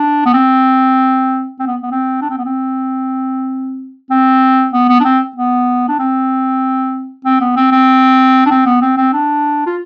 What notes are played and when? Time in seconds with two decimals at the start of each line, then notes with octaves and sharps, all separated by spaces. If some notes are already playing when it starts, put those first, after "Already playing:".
Already playing: D4
0.26 B3
0.34 C4
1.60 C4
1.67 B3
1.83 B3
1.91 C4
2.22 D4
2.30 C4
2.38 B3
2.45 C4
4.11 C4
4.73 B3
4.89 B3
5.00 D4
5.05 C4
5.36 B3
5.88 D4
5.99 C4
7.25 C4
7.41 B3
7.56 C4
7.72 C4
8.46 D4
8.51 C4
8.66 B3
8.82 C4
8.97 C4
9.13 D4
9.66 F4